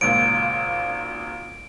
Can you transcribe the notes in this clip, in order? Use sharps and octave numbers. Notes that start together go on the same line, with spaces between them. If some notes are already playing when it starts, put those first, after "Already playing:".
G#1 C#2 A#2 D7